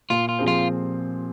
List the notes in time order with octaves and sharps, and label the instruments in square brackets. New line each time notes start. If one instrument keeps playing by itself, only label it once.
[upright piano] A#2 [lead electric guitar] F4
[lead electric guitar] F4
[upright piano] F3 C4 G#4 C5
[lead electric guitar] F4